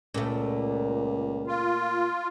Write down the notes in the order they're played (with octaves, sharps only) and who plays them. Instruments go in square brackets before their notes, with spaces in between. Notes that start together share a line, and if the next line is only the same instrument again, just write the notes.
[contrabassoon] C#2 [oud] A#2 A3
[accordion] F4